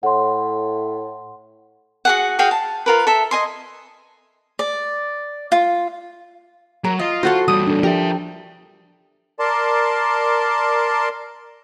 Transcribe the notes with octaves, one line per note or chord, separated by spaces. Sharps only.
A2 F#5 C6
F#4 G#4 F#5
F#4 G#4 F5 G5
A5
F4 A#4 B4
A4 E5
D#5 G#5 C6
D5
F4
F#3 A#4
F4 D#5
F#4 A4 C5 F#5 C6
E2 G3 D#6
D4 A4
F3 G4 A#4 E5
A#4 D5 A5 C6